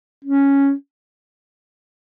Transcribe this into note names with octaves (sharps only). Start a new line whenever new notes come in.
C#4